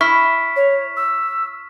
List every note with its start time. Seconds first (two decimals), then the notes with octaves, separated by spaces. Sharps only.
0.01 E4 C#6 F6 B6
0.56 C#5
0.97 E6